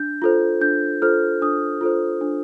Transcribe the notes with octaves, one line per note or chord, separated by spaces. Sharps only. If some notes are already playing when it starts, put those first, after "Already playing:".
Already playing: D4 G6
F4 A4 C5
D4 G6
F4 A4 C5 F6
D4 D#6
F4 A4 C5
D4